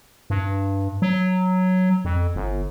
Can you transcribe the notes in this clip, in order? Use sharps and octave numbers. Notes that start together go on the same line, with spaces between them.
G2
F#3
F2
G1